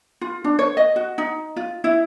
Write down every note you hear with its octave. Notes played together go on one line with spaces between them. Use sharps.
F4
D4
C#5
D#5
F#4
D#4
F4
E4